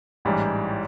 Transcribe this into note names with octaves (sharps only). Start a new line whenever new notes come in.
A1 G#2 E3 G3